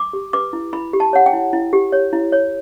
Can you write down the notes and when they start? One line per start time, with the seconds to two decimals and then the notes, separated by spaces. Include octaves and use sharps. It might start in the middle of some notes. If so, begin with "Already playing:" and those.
Already playing: D6
0.13 G4
0.33 B4 D6
0.53 E4
0.73 E4 B5
0.93 G4
1.00 A5
1.13 C#5 F#5
1.26 G5
1.33 E4
1.53 E4
1.73 G4
1.92 C#5
2.13 E4
2.32 C#5